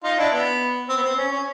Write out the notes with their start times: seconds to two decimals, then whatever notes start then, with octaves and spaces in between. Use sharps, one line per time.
0.04 D#4 F4
0.18 D4 E4
0.33 B3
0.89 C4
0.96 B3
1.03 C4
1.17 C#4
1.32 C#4